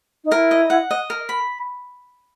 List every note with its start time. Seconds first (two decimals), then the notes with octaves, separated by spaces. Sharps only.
0.24 D#4
0.32 E4 A#4
0.51 D#5
0.70 F#5
0.91 D#5
1.10 A#4
1.29 B5